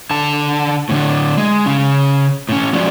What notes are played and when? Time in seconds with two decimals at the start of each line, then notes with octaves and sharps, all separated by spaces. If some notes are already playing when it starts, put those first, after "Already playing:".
0.11 D3 A5
0.89 A2 D3 D4
1.37 G#3
1.66 C#3 C#4
2.49 A2 C#4
2.73 F3 G#3 C#4 F4 F#4 D5